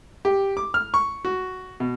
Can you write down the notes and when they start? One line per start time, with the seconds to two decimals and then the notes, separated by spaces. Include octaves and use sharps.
0.25 G4
0.57 D6
0.74 F6
0.94 C#6
1.25 F#4
1.80 B2